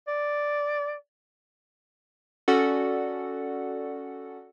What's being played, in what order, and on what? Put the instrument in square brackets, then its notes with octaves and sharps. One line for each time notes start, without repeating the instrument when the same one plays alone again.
[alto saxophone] D5
[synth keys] C#4 F#4 A4 D5 F#5